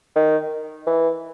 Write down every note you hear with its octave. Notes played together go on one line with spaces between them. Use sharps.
D#3
E3